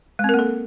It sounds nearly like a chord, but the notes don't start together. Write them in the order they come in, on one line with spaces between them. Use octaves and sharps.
G#3 C4 A#4 A#3 A4